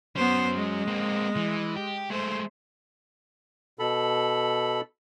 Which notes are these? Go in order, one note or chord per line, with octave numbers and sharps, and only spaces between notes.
F#3 B3 C#4 C5
G#3
A#3 C4
E3
G4
G#3 A3 C5
B2 A4 B5